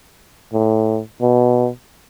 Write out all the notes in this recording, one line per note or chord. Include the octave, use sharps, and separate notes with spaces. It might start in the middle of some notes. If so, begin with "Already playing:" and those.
A2
B2